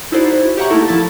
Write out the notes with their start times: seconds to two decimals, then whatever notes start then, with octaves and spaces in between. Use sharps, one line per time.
0.12 D#4 E4 F#4 A4 C5 D5
0.40 E4 F#4
0.57 G4 C#5 E5 F#5 A#5 C#6
0.70 A3 A#3 D#4 E4 A4 A#4
0.88 F3 E4 A5 A6